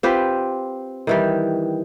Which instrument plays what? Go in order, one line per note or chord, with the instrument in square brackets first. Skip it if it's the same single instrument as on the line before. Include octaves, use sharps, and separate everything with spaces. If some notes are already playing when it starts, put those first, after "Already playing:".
[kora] C4 F4 G4 B4
D#3 E3 G3